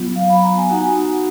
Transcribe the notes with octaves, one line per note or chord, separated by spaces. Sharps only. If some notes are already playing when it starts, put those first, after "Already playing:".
Already playing: F#3 B3 F4
F5
B5
A#5
G#5
B3 D#4 F#4 F#5